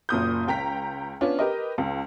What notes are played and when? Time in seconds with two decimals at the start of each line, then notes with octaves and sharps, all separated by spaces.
0.09 F#1 A#2 D#6 G6
0.47 C#2 G5 A#5 B6
1.21 B3 C#4 D4 F4
1.39 G4 A#4 B4 D#5
1.78 C#2